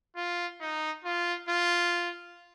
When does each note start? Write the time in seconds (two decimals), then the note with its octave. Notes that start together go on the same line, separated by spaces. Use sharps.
0.16 F4
0.61 D#4
1.04 F4
1.49 F4